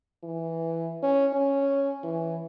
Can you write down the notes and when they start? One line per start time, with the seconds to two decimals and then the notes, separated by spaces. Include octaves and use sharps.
0.24 E3
1.03 C#4
1.33 C#4
2.04 E3